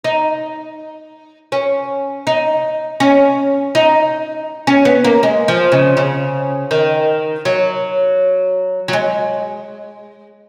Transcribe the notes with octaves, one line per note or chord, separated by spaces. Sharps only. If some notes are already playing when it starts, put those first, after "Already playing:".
D#4
C#4
D#4
C#4
D#4
C#4
B3
A#3
G#3
F3
C#3
C#3
D#3
F#3
F#3
G#3